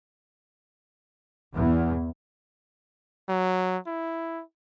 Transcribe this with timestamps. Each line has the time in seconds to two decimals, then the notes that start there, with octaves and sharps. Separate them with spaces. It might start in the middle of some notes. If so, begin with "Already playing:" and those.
1.55 E2
3.29 F#3
3.87 E4